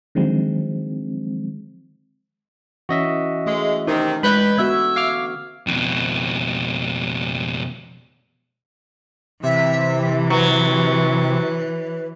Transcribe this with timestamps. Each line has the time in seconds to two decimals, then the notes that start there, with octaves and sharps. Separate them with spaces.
0.15 D3 D#3 F3 F#3 G#3 C4
2.89 E3 C#4 F#4 D#5 E5
3.46 G#3 A3
3.87 C3 D#3 D#4
4.23 G#3 B4 D#5 B5 F#6 G6
4.57 D3 B3 F#4 E5 G#6
4.96 F5 D6 F6
5.67 F2 B2
9.43 C3 E3 E5
10.30 F#3 B4